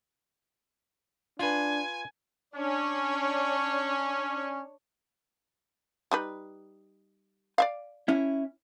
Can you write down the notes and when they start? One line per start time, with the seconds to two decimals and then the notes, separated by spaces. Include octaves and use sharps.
1.39 D4 F4 B4 G#5
2.56 C#4 D4 C#5
6.11 G3 D#4 B4
7.58 D5 E5 F5
8.08 C#4 E4